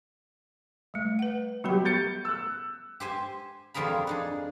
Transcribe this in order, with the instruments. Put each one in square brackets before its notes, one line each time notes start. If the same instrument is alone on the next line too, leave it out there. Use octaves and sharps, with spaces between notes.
[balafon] G3 A3
B4 F#5
[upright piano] F#3 G4 [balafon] G3 B3 B5
[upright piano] G6 A6 C#7
E6 F#6
[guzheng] G4 C5 G#5
F2 F3 G3 G#4 A#4 B5
D4 D#4 G#4